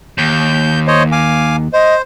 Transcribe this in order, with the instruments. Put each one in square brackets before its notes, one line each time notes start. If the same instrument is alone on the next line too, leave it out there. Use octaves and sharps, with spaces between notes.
[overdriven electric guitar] D#2 [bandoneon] G6
[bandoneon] C5 C#5 D#5
F5 G#5 D6
[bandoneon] C5 [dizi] D#5